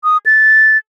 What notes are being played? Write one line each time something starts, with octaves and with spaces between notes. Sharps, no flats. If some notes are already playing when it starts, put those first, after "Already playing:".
D#6
A6